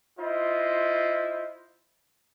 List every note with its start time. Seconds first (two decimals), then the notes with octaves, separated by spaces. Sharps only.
0.19 E4 F4 C5 D#5